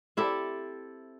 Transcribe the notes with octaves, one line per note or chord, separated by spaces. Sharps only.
C4 E4 G4 A4